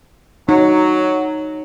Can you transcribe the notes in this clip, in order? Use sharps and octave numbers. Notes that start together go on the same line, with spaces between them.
F#3 D#4